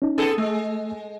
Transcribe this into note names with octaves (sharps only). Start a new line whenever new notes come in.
C#4 D#4
B3 G#4 A4
G#3 A3 E6